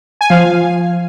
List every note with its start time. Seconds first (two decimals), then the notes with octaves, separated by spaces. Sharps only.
0.21 G#5
0.30 F3 F5